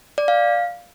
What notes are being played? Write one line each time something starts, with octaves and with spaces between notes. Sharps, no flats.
D5
F5